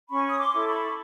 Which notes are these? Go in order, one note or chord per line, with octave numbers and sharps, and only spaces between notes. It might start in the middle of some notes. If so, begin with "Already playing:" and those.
C#4 B5 C#6
D#6
C6 D6
E4 A4
B5 C#6